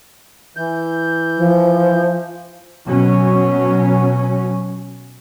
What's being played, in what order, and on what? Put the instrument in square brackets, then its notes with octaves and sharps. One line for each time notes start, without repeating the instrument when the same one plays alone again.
[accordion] E3 G6
[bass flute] F3
[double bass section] B2 F#3 C#4